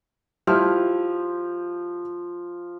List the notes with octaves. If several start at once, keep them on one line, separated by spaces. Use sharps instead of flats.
F3 G3 E4 F6